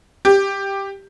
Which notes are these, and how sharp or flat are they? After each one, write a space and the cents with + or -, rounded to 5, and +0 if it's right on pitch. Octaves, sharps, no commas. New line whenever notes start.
G4 +5